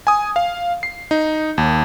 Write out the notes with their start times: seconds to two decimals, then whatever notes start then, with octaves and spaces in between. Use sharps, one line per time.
0.07 G#5 D#6
0.36 F5
0.83 C7
1.11 D#4
1.58 D#2